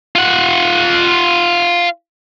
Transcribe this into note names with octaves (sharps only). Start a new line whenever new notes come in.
F4 F#5